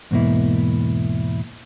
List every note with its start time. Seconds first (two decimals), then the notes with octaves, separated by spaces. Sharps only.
0.11 E2 G#2 B2 A#3 E4